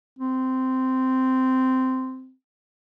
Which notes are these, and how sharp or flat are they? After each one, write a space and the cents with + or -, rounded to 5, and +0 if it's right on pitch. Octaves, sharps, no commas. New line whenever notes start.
C4 -10